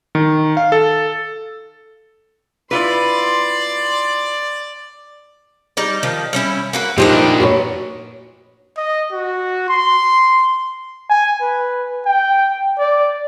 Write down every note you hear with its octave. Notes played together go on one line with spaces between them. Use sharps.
D#3
F5
A4
E4 F4 B4 D5 C6
G3 D#4 D5
D#3 F3
G3 C#4 E4
A#3 F#4 B4
A#2 E3 D4 D#4 G4 B4 C5 D#5
F#4 B4 C#5
D#5
F#4
C6
G#5
B4
G5
D5